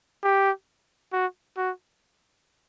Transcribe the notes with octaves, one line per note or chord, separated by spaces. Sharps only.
G4
F#4
F#4